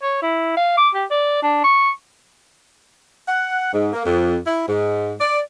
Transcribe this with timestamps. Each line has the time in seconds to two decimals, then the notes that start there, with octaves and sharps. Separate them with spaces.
0.02 C#5
0.22 E4
0.57 F5
0.77 D6
0.95 G4
1.11 D5
1.43 D4
1.64 C#6
3.28 F#5
3.73 G#2
3.93 A#3
4.05 F2
4.46 E4
4.68 G#2
5.20 D5